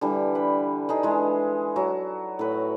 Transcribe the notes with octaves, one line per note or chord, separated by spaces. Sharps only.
D3 E3 G3
B4
D3 D#4 G#4
E3 G#3
F#3
A2 B4